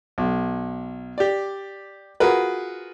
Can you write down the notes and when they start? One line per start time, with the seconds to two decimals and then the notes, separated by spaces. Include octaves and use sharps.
0.18 B1
1.18 G4 D5
2.20 F4 F#4 G#4 A#4 B4